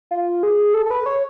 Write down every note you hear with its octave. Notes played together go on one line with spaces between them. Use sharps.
F4
G#4
A4
A4
B4
C#5